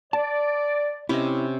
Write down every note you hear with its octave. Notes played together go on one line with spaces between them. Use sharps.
D5 A5
C3 C#4 E4 D#5